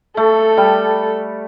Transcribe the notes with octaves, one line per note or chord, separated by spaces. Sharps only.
A3 A4
G3